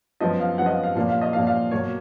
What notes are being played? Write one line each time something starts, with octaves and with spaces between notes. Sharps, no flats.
F#2 F3 B3 D#5
F5
F#2 F3 B3 F#5
D#5
F5
F5
A#2 F3 A#3 F5
F5
D#5
A#2 F3 A#3 F5
F5
B2 F#3 A#3 C#5